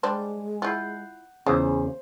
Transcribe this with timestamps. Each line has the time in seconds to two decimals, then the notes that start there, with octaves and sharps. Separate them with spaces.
0.03 G3 G#3 D4 C5
0.62 E4 F4 F#5 G6 C7
1.46 E2 C#3 G#3 C#4 F4 C5